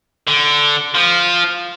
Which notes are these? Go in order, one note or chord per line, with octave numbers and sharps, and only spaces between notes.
D3
F3